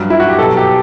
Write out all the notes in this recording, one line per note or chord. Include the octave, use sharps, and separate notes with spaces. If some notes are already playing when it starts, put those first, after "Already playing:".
Already playing: G2 F#3
E4
F#4
G4
B2 F#3 A4
G4